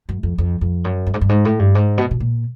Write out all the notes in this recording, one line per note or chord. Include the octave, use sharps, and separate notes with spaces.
F#2
F2
F2
F2
F#2
G2
G#2
G2
G#2
A2
G2
G#2
B2
B2
A#2